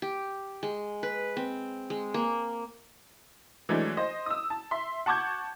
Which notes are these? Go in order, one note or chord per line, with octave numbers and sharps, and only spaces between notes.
G4
G#3
B4
C4
G#3
A#3
E3 F#3 G#3 A3 D4
C5 D#5
D#6 E6
A5
E5 C6
F#5 A5 C#6 D6 G6 G#6